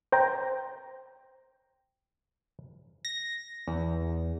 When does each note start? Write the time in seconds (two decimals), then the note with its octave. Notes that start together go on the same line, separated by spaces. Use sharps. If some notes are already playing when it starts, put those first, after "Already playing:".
0.12 C5 G5 A#5
3.05 A#6
3.67 E2